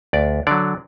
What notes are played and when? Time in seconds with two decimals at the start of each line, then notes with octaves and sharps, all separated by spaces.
0.13 D2 D5
0.47 D3 F#3 D5